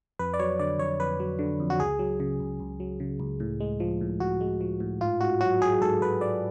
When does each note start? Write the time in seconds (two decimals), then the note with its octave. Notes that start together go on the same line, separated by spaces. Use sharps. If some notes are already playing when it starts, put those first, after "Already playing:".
0.19 F2 B4
0.34 D5
0.39 F#3 C#5
0.59 D3 D5
0.79 F2 C#5
1.00 F2 B4
1.20 F#3
1.39 D3
1.60 F2
1.70 F#4
1.79 C#2 G#4
1.99 F#3
2.20 C#3
2.40 C#2
2.60 C#2
2.80 F#3
3.00 C#3
3.20 C#2
3.40 A2
3.60 G#3
3.80 F3
4.01 A2
4.20 A2 F#4
4.41 G#3
4.61 F3
4.80 A2
5.01 G#2 F4
5.21 G#2 F#4
5.41 F#3 F#4
5.61 F#3 G#4
5.81 G#2 A4
6.01 G#2 B4
6.21 F#3 D5